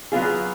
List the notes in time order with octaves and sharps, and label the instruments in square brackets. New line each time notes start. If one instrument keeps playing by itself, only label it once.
[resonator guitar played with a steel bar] F#3 B3 F4 G#4